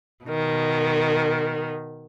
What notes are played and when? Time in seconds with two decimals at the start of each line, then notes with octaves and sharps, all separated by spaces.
0.24 B2 D#3